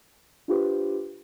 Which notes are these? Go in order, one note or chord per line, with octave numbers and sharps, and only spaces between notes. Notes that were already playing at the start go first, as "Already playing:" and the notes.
D4 F4 G4 B4 C5